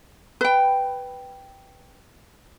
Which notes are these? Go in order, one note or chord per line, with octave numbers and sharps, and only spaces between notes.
B4 G5